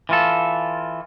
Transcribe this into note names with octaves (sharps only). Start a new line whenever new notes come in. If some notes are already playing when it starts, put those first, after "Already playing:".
E3 F4 A4